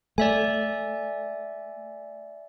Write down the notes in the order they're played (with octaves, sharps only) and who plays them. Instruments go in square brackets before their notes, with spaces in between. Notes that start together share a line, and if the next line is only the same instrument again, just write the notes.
[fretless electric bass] A3 [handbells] D5 E5 G#5